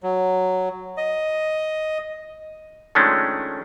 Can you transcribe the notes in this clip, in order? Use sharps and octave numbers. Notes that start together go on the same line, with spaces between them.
F#3
D#5
D#3 F3 G#3 A3 C#4 D4